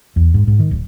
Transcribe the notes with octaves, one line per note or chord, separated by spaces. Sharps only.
E2
G#2
G#2
D#3
D1